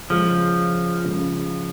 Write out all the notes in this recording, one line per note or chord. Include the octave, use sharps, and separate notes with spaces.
C#3 F3 G#3 C#4
C#3 G#3 C#4